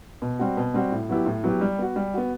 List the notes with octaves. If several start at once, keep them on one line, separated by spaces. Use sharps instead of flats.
B2
G3 C4 F#4
B2
G3 C4 F#4
A2
F#3 B3 E4 G4
A2
F#3 B3 E4 G4
G3
B3 F#4
G3
B3 F#4